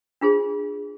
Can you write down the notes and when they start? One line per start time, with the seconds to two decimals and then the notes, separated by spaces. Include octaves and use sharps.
0.21 D4 F4 G#4 C5